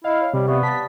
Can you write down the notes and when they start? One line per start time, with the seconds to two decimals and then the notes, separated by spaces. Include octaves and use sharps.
0.04 E4 D#5 F5 F6
0.21 C#5
0.34 C3 G3
0.48 C3 B3 D5 E5 C#6
0.63 A5 A6 B6